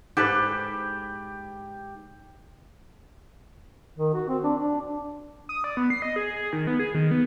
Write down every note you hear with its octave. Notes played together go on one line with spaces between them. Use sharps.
G#2 G4 A4 B4
D#3
F#4
C4
D4
D4
D#6
D5
B3
C7
D#5
G#4
G#4
D#3
B3
G#4
D#3
B3